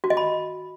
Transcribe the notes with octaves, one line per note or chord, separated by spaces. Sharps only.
F#4
D#5
B5